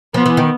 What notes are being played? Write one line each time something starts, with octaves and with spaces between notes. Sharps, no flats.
F3 B3
E3
D#3